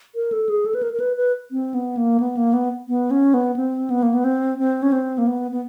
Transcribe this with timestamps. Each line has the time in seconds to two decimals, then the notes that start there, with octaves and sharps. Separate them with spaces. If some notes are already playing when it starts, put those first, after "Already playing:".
0.15 A#4
0.32 A4
0.49 G#4
0.66 A4
0.75 B4
0.83 A#4
0.93 A#4
1.00 B4
1.17 B4
1.51 C4
1.74 B3
1.97 A#3
2.20 B3
2.37 A#3
2.53 B3
2.88 B3
3.11 C#4
3.34 B3
3.56 C4
3.90 B3
4.03 A#3
4.14 B3
4.24 C4
4.59 C4
4.82 C#4
4.92 C4
5.18 A#3
5.27 B3
5.51 B3